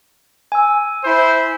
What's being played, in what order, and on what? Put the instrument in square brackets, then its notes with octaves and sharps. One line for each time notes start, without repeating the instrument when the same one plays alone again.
[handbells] G#5 E6
[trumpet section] E4 C5